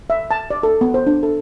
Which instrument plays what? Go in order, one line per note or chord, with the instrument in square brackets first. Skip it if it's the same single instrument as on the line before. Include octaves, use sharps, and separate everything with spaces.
[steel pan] E5
A5
D5
A4
B3
C5
D4
A4